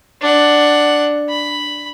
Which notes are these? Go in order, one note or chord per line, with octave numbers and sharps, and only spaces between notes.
D4 F#5
B5